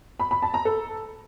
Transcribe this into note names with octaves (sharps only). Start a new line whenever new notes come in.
B5
B5
A5
A#5
A4